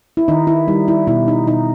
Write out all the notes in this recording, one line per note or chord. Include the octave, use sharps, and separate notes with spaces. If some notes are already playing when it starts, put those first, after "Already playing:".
E4
D#3 D#4
E4
G3 D#4
E4
B2 E4
D#4
B2 D#4